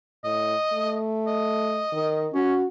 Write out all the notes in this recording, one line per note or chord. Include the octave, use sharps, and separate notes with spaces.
A2 D#5
A3
D#5
D#3
C#4 F#4